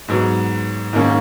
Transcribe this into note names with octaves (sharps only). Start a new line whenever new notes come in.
G#2 F#3 B3
G#2 D#3 A#3 C#4